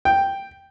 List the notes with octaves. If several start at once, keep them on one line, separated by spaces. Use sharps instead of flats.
G5